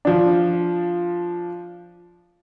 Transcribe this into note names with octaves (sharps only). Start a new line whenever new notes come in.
F3 D4